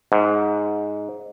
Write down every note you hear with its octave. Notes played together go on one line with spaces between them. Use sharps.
G#2